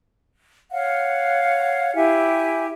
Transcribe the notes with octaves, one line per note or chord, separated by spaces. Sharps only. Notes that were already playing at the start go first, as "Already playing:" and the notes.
C#5 F5 F#5
E4 G4 E5 G#5